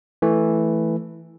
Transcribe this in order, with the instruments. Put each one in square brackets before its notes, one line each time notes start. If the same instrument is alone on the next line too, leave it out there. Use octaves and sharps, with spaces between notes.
[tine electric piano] E3 A3